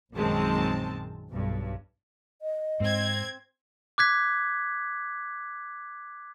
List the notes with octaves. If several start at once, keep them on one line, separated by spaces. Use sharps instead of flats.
A#1 F#2 D#3 G#3 C4 A5
B1 G2
D#5
G#2 C4 G#6
D6 F#6 G#6 B6